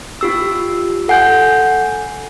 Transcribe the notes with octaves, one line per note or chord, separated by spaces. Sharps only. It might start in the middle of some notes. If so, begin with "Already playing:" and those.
F4 G4 E6
A4 F#5 G#5 G6